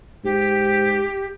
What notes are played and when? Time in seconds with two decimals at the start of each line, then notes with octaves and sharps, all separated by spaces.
0.24 G#2 G4